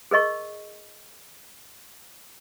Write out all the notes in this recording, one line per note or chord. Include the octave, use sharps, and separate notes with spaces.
G#4 A#4 D#5 C#6